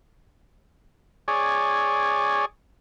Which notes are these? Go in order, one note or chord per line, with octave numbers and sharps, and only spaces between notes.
G#4 C#5 D5